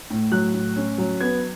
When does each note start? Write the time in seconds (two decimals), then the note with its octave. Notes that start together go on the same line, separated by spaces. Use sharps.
0.10 A2
0.32 F#3 F#6
0.54 A2
0.76 C#4
0.98 F#3
1.21 B3 G#6